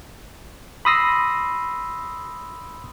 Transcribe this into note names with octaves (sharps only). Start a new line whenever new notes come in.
B5 C6 D#6 E6 A#6 C7